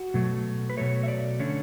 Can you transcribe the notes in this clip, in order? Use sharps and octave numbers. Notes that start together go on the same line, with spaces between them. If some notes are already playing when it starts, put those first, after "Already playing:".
Already playing: F#4
B2 F#3 A3
B4
B2 F#3 A3 C#5
E5
D5
D3 A3 C#4